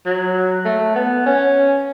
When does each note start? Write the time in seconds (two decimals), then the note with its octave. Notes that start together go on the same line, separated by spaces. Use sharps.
0.06 F#3
0.65 A3
0.96 B3
1.26 C#4